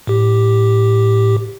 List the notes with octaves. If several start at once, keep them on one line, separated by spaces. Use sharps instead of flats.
A2 G4